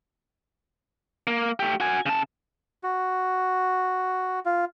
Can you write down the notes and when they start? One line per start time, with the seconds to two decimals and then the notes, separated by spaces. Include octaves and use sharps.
1.27 A#3
1.59 A3 G4
1.80 F#4 G#5
2.06 C#3 A5
2.83 F#4
4.46 F4